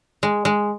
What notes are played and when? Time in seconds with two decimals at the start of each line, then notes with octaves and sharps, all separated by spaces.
0.23 G#3
0.45 G#3